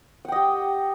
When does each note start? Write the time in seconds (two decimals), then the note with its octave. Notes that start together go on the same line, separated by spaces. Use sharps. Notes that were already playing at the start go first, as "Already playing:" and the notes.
0.25 F#5
0.28 G5
0.32 D#5
0.36 G4